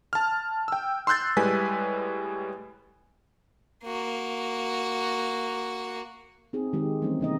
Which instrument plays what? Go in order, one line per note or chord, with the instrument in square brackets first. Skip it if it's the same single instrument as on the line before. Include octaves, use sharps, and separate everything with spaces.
[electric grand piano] A5 F6
G5 E6
C6 E6 F#6 G6 A6
A2 G3 G#3 B4 G#5 B6
[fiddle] A#3 F#4
[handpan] C4 D#4 G#4
D#3 G#3 G4
E3 G3 A3 C4 C#4 D#4
C3 A#3 D#4 D#5